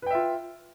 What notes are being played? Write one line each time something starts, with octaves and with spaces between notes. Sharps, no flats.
F4 B4 E5 G5